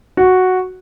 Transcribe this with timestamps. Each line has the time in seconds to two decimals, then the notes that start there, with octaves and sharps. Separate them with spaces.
0.17 F#4